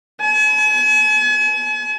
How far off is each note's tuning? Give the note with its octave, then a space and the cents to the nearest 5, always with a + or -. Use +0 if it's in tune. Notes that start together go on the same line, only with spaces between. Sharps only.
G#5 +45